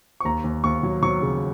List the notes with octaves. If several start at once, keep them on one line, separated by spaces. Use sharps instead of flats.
C#6
D#2 A#5
D#2
D#2 C#6
F#3
F#3 C#6
C#3